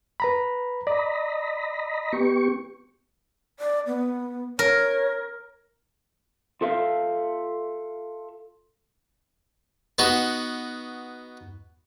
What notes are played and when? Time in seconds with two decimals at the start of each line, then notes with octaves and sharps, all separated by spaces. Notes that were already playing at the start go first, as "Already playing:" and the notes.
0.20 B4 A#5 B5
0.87 D5 D#5 A#5 B5
2.13 B3 G4 C#6
3.59 D5
3.87 B3
4.59 A#4 C#5
6.61 F4 A4 E5 F5
9.99 B3 D#4 F#4